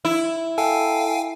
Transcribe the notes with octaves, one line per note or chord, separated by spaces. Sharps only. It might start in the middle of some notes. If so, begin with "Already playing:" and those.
E4
A4 F5 G5 G#5